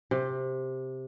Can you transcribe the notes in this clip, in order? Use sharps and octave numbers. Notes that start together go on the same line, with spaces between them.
C3